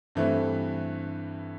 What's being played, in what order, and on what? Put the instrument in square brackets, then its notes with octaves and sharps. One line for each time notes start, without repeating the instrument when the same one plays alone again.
[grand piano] G2 E3 A3 C4